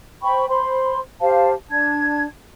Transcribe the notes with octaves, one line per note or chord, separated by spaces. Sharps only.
C5 G5 B5 C#6
C5 B5 C6
G4 C5 F5 A5
D4 A5 G#6